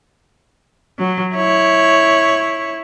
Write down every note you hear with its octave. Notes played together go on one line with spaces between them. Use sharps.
F#3
E4 C#5